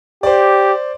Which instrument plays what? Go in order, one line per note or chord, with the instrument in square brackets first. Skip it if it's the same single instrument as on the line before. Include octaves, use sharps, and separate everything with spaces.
[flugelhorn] G4 [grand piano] C5 D5